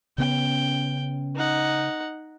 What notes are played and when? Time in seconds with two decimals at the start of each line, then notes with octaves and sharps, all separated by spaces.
0.18 C#3 B3 C#4 G5
1.36 D#4 F#5